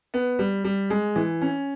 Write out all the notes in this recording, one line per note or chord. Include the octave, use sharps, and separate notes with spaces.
B3
G3
G3
G#3
E3
C#4